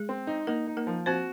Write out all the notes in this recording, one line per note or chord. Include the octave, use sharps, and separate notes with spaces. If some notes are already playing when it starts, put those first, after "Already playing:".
Already playing: G#3 G#4
C4
D#4
A#3 D#4 A#4
D#4
A#3 A#4
F3
C4 F#4 C5